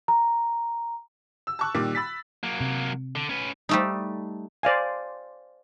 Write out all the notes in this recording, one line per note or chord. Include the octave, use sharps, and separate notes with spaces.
A#5
E6
A5 C#6 F#6
A#2 D#3 G3 A#3 D6
B5 E6 A6 B6
F#3 A#3
C3
D3
C#4 B4
G3 A3 D#4
C5 D5 F5 G#5